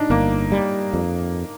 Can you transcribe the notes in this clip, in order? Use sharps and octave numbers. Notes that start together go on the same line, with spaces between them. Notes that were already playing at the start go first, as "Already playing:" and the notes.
Already playing: D4 D#4
G1 A#3
G3
F2